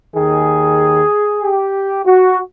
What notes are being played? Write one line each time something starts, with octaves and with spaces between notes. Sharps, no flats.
D#2 D#3 G#4
G4
F#4